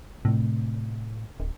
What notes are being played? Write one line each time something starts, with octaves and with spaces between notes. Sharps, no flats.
A2 C3 A3
D1